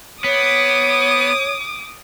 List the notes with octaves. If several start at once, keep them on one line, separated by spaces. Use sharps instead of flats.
B3 C#5 D6 D#6